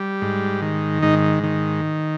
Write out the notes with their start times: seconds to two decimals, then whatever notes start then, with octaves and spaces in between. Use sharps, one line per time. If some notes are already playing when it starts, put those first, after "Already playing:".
Already playing: G3
0.22 G#2
0.62 D#3
1.02 G#2 D#4
1.43 D#3